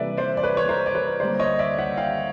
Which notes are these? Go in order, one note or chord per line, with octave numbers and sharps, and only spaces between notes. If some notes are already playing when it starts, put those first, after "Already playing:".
Already playing: C3 E3 G3 A#3 A4 B4 D5 E5
C5 D5
D5
B4 C#5
C#5
A#4 C5
D5
B4 C#5
D3 G3 A#3 C5 D5
C#5 D#5
D5 E5
E5 F#5
F5 G5